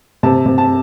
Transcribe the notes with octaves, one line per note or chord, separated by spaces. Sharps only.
C3 A5
C3
A5